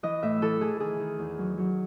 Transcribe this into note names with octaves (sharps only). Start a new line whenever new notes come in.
E3 D#5
A2 E5
E3 A4
E3 G#4
D#3 G#4
D#3
E2
F#3
F#3